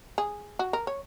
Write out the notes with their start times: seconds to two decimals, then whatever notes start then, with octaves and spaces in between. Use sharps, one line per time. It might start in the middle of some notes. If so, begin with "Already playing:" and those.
0.18 G#4
0.59 F#4
0.73 A#4
0.87 C#5